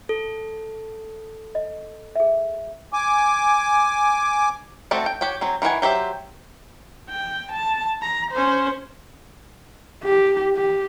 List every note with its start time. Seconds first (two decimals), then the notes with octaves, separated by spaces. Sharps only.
0.09 A4
1.55 D#5
2.15 G#4 E5
2.93 G#5 D6
4.91 A3 C4 F#4 A4 D5
5.06 G5
5.21 F#4 G4 C#5 G5
5.41 F#3 C4 G#4
5.62 D#3 E3 F#4 F#5 G#5
5.82 F#3 G4 C5 E5
7.10 G5
7.51 A5
8.02 A#5
8.31 C#4 C5
10.04 G4
10.56 G4